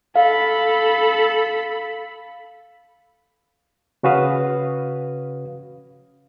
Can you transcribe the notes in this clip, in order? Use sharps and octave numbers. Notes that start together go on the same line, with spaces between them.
A4 F5 B5
C#3 C#4 F#4 B4 F5 D#6